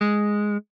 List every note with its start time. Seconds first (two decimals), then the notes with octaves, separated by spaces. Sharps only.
0.01 G#3